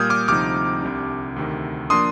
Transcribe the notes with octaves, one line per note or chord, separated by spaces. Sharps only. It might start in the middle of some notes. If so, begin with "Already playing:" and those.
Already playing: A#2 G3 A#3 D#6 F6 G6 G#6
D6 F6
D2 C3 F3 C4 D#4 D6 F6
C2 C3 G3 D4
D2 C3 D#3
F3 A#3 D4 C6 D#6